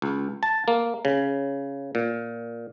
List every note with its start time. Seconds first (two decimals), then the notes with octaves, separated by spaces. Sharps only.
0.02 C#2
0.43 A5
0.68 A#3
1.05 C#3
1.95 A#2